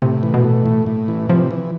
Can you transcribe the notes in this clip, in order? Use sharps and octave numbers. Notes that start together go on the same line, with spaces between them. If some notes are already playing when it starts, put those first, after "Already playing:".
A2 C3
E3
B2
A3
A2
A2
E3
C3 F3
E3